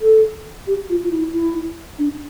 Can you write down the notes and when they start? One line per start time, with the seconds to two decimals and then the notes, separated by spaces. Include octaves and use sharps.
0.01 A4
0.67 G4
0.89 F4
1.04 F4
1.11 E4
1.33 E4
1.99 D4